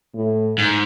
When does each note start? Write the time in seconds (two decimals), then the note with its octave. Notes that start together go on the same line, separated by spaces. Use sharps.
0.15 A2
0.58 G#2